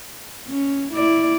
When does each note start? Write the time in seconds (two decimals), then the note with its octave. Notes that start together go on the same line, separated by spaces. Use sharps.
0.49 C#4
0.93 E4 D5